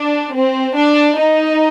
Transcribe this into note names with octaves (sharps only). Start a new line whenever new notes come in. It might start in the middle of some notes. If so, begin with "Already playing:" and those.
Already playing: D4
C4
D4
D#4